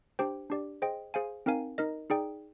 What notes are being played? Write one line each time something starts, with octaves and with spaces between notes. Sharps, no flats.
D4 G4 C5 G5
D4 G4 D5
G#4 C5 D#5 G5
G#4 C5 F5 G#5
C4 D#4 A#4 F5 G#5
D#4 A#4 D#5
D#4 G#4 D5 G5